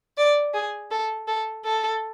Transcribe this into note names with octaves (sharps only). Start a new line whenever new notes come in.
D5
G#4
A4
A4
A4